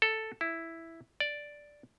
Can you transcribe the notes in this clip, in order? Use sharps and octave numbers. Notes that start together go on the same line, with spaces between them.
A4
E4
D5